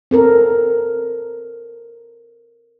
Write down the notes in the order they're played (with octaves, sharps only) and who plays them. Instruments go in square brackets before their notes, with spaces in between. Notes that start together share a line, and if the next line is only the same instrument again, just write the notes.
[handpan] C4 A4 A#4